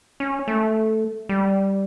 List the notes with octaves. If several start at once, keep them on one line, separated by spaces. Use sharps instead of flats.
C#4
A3
G3